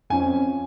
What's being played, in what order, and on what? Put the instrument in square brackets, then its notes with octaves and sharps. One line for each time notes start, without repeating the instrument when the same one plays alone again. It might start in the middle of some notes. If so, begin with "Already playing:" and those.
[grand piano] F2 F3 C#4 G#5